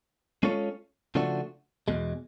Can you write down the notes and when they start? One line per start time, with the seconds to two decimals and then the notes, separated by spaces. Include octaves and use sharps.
0.43 G#3 C#4 F4 A4 C#5
1.15 C#3 F3 A3 D4 F#4
1.88 E2 B2 G#3